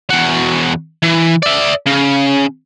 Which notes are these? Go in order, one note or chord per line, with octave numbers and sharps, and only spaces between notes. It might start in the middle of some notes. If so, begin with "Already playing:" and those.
E2 F#4
E3
D5 E5
C#3